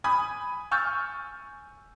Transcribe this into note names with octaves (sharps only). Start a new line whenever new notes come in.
G#5 B5 D#6 G#6
G#5 C#6 E6 F6 G6 A6